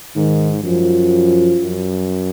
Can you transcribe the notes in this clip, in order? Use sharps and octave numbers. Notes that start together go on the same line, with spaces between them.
G#2 D#3
F#2 F3
F#2